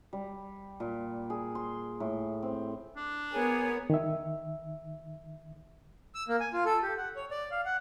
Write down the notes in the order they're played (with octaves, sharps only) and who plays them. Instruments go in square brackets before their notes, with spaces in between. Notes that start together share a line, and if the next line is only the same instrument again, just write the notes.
[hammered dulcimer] G3
A#2
G#4
C6
A2
C4
[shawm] D4
[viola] B3 A#4 [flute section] G#4 C#5 G#5
[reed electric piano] D#3 E5
[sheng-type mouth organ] E6
A#3
G#5
F4
A4
G4
F#5
C#5
D5
F5
F#5